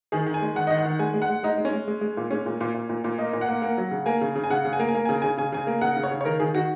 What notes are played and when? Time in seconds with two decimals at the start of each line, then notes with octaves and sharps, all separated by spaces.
0.12 D#3 G#4
0.27 D#3
0.34 G#5
0.42 G#3
0.56 D#3 F#5
0.67 D#3 D#5
0.78 F#5
0.85 D#3
0.99 G#3 G#5
1.14 G#3
1.22 F#5
1.29 G#3
1.43 G#3 D#4
1.58 G#3
1.65 C#4
1.73 G#3
1.88 G#3
2.01 G#3
2.17 A#2
2.31 G#3 C#4
2.46 A#2
2.61 A#2
2.74 A#2
2.89 A#2
3.04 A#2
3.18 A#3 D#5
3.33 A#2
3.41 F#5
3.49 A#3
3.62 A#3
3.78 F#3
3.91 C#3
4.06 A#3 G#5
4.21 C#3
4.36 C#3
4.44 G#5
4.50 C#3 F#5
4.65 C#3
4.73 G#5
4.79 A#3
4.88 G#5
4.95 A#3
5.05 G#5
5.09 C#3
5.22 C#3 G#5
5.38 C#3 G#5
5.52 C#3 G#5
5.67 A#3
5.81 C#3 F#5
5.97 C#3
6.03 C#5
6.11 C#3
6.21 C#5
6.25 D#3 A#4
6.40 D#3 G#4
6.54 D#3 F#4